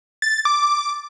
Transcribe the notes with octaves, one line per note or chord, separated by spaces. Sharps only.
A6
D6